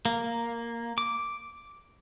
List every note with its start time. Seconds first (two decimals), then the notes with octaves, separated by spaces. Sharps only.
0.05 A#3
0.98 D6